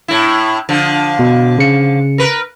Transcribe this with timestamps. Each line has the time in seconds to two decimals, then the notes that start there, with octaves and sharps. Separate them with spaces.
0.08 A2 E4
0.69 D3 F3
1.19 B2
1.59 C#3 C#7
2.18 A#4 B4